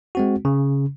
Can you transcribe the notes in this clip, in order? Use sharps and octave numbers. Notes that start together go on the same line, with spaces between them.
G#3 C4 F#4
C#3